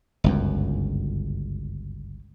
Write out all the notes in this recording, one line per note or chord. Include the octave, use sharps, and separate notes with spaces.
G1 C#2 F#2